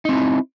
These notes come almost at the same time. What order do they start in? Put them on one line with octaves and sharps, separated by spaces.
D#4 C4 E4